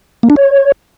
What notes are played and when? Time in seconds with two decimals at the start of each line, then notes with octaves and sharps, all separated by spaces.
0.23 A#3
0.30 D4
0.36 C#5